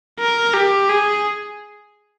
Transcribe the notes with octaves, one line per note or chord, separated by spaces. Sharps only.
A#4
G4
G#4